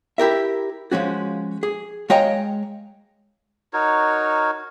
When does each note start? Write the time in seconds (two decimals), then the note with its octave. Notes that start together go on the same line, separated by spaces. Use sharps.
0.18 E4 G4 A#4 E5
0.92 F3 G#3 C#4 F#4
1.63 G#4
2.10 G#3 C#5 D#5 F5 G5 A#5
3.73 D#4 F#4 A#4 C#5